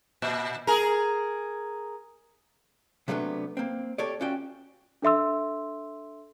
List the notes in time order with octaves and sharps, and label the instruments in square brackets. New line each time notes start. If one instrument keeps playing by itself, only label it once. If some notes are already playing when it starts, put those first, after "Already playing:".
[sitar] A#2
G#4 A#4
[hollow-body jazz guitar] C3 F#3 A3 B3 C#4 D4
A#3 C4
G4 A4 C#5 D5
C#4 F4 F#4 D5 G5
[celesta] D4 A4 E5 C6 E6